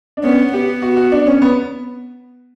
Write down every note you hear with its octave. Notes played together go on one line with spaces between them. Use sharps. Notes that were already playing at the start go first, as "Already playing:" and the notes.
D4
B3 C#4
B3 G4
F#4
F#4
D4
C#4
B3